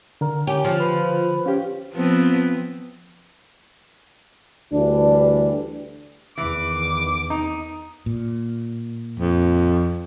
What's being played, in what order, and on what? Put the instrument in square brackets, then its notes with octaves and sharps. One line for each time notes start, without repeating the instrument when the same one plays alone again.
[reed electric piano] D3 [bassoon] A#4
[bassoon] C#4 [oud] G4
[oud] F3
[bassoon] B4
[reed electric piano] C#4 G4 [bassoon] F4
[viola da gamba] F3 B3 C4
[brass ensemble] D2 E3 G3 D4
[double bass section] E2 D#3 [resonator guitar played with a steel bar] E3 [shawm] D6
[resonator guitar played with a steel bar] D#4
[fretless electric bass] A#2
[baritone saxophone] F2